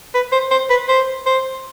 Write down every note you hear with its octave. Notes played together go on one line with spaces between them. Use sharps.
B4
C5
C5
B4
C5
C5